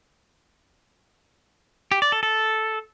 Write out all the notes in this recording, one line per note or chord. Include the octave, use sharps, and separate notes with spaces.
G4
D5
A4
A4